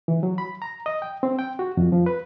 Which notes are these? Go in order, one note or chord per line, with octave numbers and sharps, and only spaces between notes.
E3
F#3
B5
A#5
D#5
G5
C4
G5
F#4
F2
F3
B4